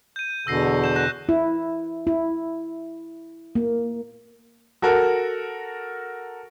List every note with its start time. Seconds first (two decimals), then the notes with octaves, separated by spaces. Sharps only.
0.16 G6 D#7
0.47 E2 B2 D3 E6 A#6 C7
0.84 G6 E7
0.96 F#6 A#6 E7
1.29 E4
2.07 E4
3.55 A#3
4.82 F#4 A4 A#4 F#5